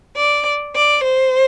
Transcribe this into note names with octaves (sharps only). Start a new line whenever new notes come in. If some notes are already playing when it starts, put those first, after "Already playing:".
D5
D5
C5